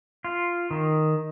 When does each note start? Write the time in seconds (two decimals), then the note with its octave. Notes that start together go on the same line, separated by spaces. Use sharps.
0.24 F4
0.71 D#3